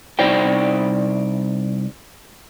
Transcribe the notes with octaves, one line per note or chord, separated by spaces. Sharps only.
C2 D#4 C5 D5 G5